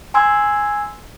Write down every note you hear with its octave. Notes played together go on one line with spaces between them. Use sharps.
G#5 C6 E6 G#6